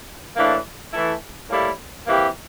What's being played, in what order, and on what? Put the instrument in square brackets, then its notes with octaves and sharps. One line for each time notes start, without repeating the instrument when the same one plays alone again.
[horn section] A2 E3 A#3 D4
E3 A3 E4 A4
A2 G3 A#3 E4 A4
C3 E3 A#3 E4 G4